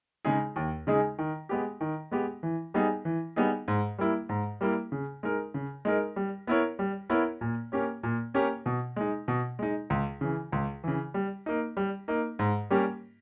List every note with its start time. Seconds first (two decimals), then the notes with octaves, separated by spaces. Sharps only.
0.25 C#3 G#3 D#4 G#4
0.56 D#2
0.87 C#3 G#3 D#4 G#4
1.18 D#3
1.49 G#3 B3 G4
1.81 D#3
2.11 G#3 B3 G4
2.43 E3
2.74 G3 B3 D#4 G#4
3.05 E3
3.36 G3 B3 D#4 G#4
3.68 G#2
3.99 G3 A#3 E4
4.29 G#2
4.61 G3 A#3 E4
4.92 C#3
5.23 G#3 D#4 A#4
5.54 C#3
5.85 G#3 D#4 A#4
6.16 G3
6.47 B3 E4 A#4 C#5
6.79 G3
7.10 B3 E4 A#4 C#5
7.41 A#2
7.72 A#3 C#4 G4 C#5
8.03 A#2
8.34 A#3 C#4 G4 C#5
8.66 B2
8.96 G#3 D#4
9.28 B2
9.59 G#3 D#4
9.90 C#2
10.21 C#3 E3
10.52 C#2
10.84 C#3 E3
11.14 G3
11.46 A#3 D#4
11.77 G3
12.08 A#3 D#4
12.39 G#2
12.70 G3 A#3 C#4 G4